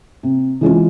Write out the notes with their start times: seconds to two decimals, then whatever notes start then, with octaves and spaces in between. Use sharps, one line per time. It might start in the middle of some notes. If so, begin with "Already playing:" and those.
0.23 C3
0.61 E3 G#3 C#4 F4